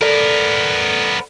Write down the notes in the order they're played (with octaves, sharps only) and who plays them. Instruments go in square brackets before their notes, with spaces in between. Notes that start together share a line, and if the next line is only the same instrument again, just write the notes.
[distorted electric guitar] B3 A#4 [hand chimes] A4 D5